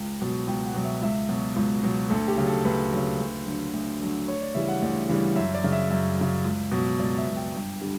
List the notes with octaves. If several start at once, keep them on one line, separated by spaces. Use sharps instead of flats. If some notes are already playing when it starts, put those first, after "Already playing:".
Already playing: C#2 G5
B2 F#3
C#2 G5
F#5
B2 F#3
E5
C#2 E5
B2 F#3
C#2
B2 F#3
D2 A4
G4
C#3 F#3
A4
D2 B4
C#3 F#3
D2
D3 F#3
D2
D3 F#3
D2 C#5
D5
C#3 E3 G3 E5
F#5
D2 D5
C#3 E3 G3
F#2 E5
D5
C#3 F#3
E5
F#2 E5
C#3 F#3
C#2
B2 F#3
C#2 D5
E5
B2 F#3
G5
G2
D3 G3